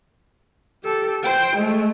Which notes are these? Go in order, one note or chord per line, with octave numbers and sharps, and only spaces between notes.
G4 A4
C5 G5
G#3 A3